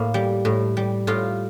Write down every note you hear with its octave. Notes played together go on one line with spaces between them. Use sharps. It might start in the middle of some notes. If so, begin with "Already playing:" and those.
Already playing: A2 A#3
G3
A2
G3
A2 F4